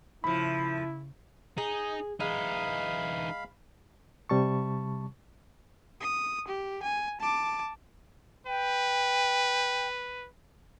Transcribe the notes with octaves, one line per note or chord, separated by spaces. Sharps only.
A2 C#3 F3 E4 B5
D#4 G#4
E3 G#3 D#4 F5 B5
C3 G3 A5 C#6
D#6
G4
G#5
A5 D6
B4 G5